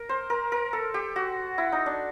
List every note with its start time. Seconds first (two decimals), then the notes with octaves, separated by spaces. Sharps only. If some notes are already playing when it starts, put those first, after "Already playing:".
Already playing: A#4
0.09 C5
0.30 A#4
0.52 A#4
0.73 A4
0.94 G4
1.16 F#4
1.58 E4
1.72 D#4
1.86 D4